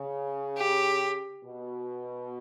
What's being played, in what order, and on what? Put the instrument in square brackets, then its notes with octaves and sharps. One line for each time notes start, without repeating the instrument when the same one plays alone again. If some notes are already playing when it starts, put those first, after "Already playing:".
Already playing: [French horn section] C#3
[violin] G4
[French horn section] B2